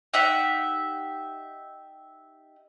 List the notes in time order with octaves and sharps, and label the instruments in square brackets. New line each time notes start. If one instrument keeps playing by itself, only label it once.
[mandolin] D#4 G4 E5 F#5